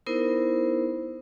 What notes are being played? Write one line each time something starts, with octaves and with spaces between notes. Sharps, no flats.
B3 D#4 E4 A#4 C5